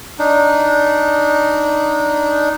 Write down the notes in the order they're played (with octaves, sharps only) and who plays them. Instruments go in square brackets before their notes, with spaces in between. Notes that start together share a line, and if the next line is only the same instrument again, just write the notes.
[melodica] D4 D#4